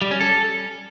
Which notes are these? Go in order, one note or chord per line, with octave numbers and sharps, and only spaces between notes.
G3
C#4
A4